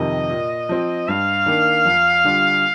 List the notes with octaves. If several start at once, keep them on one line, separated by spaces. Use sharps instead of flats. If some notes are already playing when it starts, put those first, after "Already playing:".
Already playing: F2 C3 D#3 D#5
A#2
F3 C4
G2 F5
D#3 A#3 D4
F2
D3 G3 D4 F4